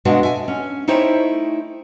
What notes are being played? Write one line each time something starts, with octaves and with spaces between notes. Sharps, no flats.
B2 G#3 D4 F#4 F5 F#5
E5 G#5
C#4
A3 D#4 E4 C5 C#5 G5